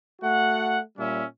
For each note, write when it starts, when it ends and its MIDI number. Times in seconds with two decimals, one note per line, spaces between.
0.22 0.79 57
0.22 0.79 66
0.22 0.79 78
0.97 1.24 46
0.97 1.24 55
0.97 1.24 61
0.97 1.24 76